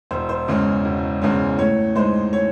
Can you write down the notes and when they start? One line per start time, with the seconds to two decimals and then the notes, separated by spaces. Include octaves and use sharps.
0.11 E1 C5
0.29 C5
0.48 E2 C#3 G#3 C#4
0.85 E1
1.22 E2 C#3 G#3 C#4
1.58 A2 C#5
1.96 G#3 D#4 C5
2.33 A2 C#5